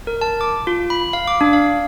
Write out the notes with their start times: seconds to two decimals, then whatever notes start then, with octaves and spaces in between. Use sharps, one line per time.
0.07 A#4
0.21 A5
0.41 D6
0.67 F4
0.90 B5
1.13 F5
1.28 D6
1.41 D4
1.53 F5